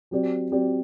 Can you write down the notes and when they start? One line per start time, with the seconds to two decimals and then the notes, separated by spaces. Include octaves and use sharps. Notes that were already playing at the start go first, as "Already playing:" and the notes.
0.11 F#3 C4 G4 D5
0.52 F#3 C4 G4 D5